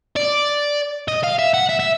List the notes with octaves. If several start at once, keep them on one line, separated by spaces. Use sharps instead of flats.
D5
D#5
F5
E5
F#5
E5
E5